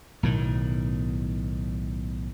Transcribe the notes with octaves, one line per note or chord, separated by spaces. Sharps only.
B1 A2 D#3